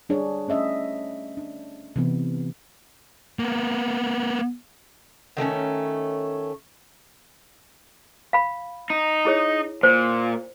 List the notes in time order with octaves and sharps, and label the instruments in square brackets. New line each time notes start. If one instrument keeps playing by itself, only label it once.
[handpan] G3 D4 G#4 C#5
A3 C#4 D#5 E5
D4
C3 E3 B3
[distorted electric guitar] A#3 B3
[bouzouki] D#3 A3 C4 C#4
[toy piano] F5 B5
[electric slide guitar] D#4
[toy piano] E4 G#4 C#5
[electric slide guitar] A#2 [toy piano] C5